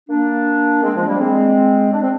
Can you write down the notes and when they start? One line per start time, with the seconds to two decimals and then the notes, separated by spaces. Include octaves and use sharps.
0.09 A#3 D4
0.83 G#3 C4
0.95 F3 G#3
1.07 G3 A#3
1.20 G#3 C4
1.93 D4
2.01 C4